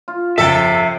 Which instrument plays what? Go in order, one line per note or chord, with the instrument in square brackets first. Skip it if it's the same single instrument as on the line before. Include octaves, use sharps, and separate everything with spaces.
[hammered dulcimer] F4
[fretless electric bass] G1 F2 C#3 [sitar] A4 [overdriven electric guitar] E5 G5